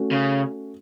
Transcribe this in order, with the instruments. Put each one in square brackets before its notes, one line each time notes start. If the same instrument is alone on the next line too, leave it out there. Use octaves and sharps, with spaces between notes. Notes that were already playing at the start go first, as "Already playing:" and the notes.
Already playing: [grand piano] A3 C#4 F#4
[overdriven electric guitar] C#3